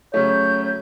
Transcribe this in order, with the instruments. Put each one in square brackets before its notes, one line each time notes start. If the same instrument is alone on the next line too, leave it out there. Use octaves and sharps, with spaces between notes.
[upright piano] C#3 F#3 A3 [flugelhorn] C#5 [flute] G6